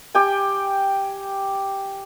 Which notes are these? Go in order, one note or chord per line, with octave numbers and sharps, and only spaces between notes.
G4 G5 G#5